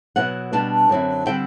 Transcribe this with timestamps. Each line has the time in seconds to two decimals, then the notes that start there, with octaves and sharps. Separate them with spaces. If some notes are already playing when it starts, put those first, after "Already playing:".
0.16 B2 F#3 B3 E4 F#5
0.53 B2 G3 B3 D4 A5
0.89 F#2 D3 F#3 C4 E4
1.26 D3 G3 C4 E4 G5